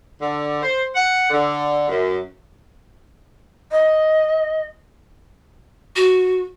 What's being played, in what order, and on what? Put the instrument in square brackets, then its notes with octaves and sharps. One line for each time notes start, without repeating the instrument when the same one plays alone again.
[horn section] D3
C5
F#5
D3
F#2
[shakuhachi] D#5
[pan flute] F#4